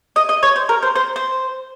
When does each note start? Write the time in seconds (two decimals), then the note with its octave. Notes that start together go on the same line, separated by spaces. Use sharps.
0.16 D#5
0.29 D#5
0.43 C#5
0.56 C5
0.69 A#4
0.82 C5
0.96 C5
1.16 C5